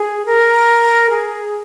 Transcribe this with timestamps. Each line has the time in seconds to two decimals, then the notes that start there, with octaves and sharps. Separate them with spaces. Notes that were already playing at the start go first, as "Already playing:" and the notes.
Already playing: G#4
0.26 A#4
1.10 G#4